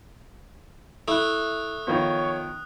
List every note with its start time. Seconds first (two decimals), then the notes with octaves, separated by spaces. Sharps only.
1.08 A3 E4 D#6 F#6
1.87 D#3 F3 B3 C#5